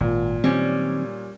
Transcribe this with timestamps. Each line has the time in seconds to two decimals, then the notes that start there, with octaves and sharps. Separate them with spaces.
0.01 G#1 A#2
0.44 D#3 F#3 G3 C4 C#4